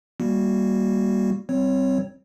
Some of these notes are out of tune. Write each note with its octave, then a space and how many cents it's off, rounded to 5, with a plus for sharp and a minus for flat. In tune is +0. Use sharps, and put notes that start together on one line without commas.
G3 +0 A#3 +10 F#4 +0
G3 -20 C4 +0 C#5 +0